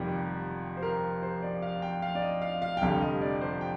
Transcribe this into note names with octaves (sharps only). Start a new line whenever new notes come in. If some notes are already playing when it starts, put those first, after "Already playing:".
Already playing: F1 F2 D#3 G3 G4
C5
A#4
C5
D5
F5
G5
F5
D5
D#5
F5
F5
G5
F1 F2 D3 G3 F5
D#5
D5
C5
G5